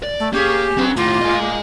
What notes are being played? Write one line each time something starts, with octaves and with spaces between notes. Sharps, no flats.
D5
A3
A#3 C#4 G4 G#4
F#2 F#3 B3 C4
D#2 A2 A#3 F4
A2 A#3 D#5 G#5